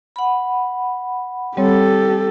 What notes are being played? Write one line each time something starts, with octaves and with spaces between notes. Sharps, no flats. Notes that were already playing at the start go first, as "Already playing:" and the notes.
F#5 B5
G3 C4 G4 A4 C#5